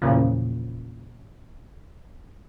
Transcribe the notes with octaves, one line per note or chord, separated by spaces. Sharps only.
E2 A#2 C#3 F3